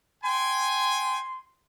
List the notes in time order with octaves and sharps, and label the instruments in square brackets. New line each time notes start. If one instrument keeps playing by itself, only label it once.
[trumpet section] G5 G#5 [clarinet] C6